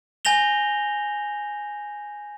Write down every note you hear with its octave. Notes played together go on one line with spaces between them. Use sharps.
G#5 G6 A#6 F7 G7